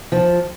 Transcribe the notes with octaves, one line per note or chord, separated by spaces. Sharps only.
F3